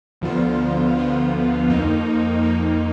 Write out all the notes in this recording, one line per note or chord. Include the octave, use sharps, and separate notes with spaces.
D2 D3 F3 B3 F4
D2 D3 F3 B3 F4
F2 F3 A#3 D#4
F2 F3 A#3 D#4